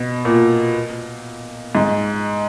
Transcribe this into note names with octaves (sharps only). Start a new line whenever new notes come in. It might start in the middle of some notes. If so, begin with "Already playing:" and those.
Already playing: B2
A#2
G#2